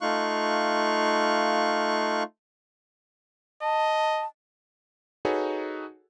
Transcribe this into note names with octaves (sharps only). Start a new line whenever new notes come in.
A3 D#4 F4 F5 C#6 F#6
D#5 A5
D#4 F#4 G#4 A4 B4 C#5